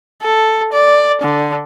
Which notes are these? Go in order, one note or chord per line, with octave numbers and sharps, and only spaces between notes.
A4
D5
D3